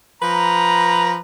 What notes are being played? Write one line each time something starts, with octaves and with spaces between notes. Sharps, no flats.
F3 B4 A#5